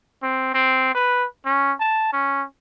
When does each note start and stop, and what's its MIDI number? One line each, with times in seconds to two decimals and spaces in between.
0.23 0.51 60
0.54 0.93 60
0.95 1.25 71
1.45 1.72 61
1.80 2.08 81
2.13 2.43 61